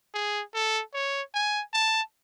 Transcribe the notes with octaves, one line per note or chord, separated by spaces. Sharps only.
G#4
A4
C#5
G#5
A5